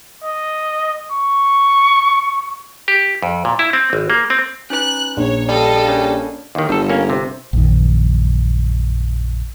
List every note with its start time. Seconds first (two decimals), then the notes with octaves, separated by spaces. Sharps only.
0.24 D#5
1.12 C#6
2.88 G4
3.23 F2
3.45 A#2
3.59 E4
3.73 C4
3.93 G#1
4.10 A#3
4.30 C4
4.70 C#4 D#4 B4 F#6
5.17 A#1 C#5
5.49 G3 A4 D#5 F5
5.88 C#4 A#4 C#5
6.55 D#2 D#3
6.69 G1 G3 A4
6.90 A#3 C#4
7.10 C3
7.53 A#1 F#2 D#3